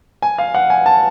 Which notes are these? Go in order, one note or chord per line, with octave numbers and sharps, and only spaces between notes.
G#5
F5
F#5
G#5
A5